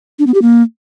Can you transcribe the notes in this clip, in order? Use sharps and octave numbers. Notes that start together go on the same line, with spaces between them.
D4
B3
G4
A#3